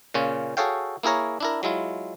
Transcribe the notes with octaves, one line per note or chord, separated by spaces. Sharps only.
A#2 C#3 C#4 F4
F#4 G#4 A4 C#5 F5 G5
A#3 E4 G#4 A#4 C#5
D4 E4 A#4
F#3 G#3 E4 F4